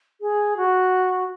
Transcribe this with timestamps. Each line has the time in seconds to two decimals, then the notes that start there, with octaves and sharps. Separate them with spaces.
0.21 G#4
0.57 F#4